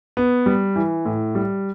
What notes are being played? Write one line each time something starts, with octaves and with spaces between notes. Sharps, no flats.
B3
G3
E3
A2
G3